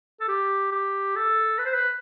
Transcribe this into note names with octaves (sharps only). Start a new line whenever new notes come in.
A4
G4
G4
A4
B4
C5
B4